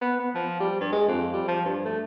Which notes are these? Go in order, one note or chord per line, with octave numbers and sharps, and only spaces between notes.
B3
B3
F3
G3
G2
G#3
F2
G3
F3
G2
A3